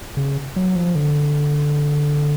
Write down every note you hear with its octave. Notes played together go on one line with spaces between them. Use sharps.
C#3
F#3
F3
D3